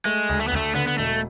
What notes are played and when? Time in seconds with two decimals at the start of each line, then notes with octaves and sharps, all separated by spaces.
0.05 G#3 A3
0.29 D2
0.40 A3
0.48 B3
0.52 D2 A3
0.75 D3 B3
0.87 B3
0.98 E1 A3